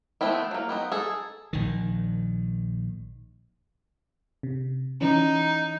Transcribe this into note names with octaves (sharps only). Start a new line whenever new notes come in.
F3 A3 B3 C4 E4
F#3 A#3
B3 C4 D#4
G#4 A4
A#1 D#3
C3
E3 C#4 D#4